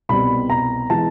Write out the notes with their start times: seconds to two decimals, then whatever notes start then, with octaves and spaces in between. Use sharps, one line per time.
0.09 C2 B2 G3 C4 B5
0.50 A#5
0.90 E3 G#3 B3 A5